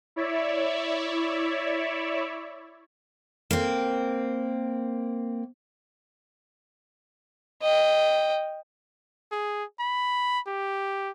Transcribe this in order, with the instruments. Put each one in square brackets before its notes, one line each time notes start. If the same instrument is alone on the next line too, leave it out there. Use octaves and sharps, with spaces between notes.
[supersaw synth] E4 C#5 D5 E5
[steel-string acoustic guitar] A#3 C4
[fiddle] D#5 G5
[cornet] G#4
B5
G4